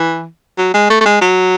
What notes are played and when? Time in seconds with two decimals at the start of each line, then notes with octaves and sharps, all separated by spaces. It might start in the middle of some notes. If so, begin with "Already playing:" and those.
Already playing: E3
0.58 F#3
0.74 G#3
0.90 A3
1.01 A3
1.05 G#3
1.21 F#3